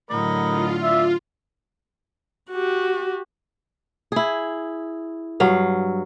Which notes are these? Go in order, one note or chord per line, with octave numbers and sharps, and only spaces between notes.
A2 D3 F#3 A#4 D#5 B5
F4
D5 E5
F#4 G4
E4 G#4
G2 F#3 F5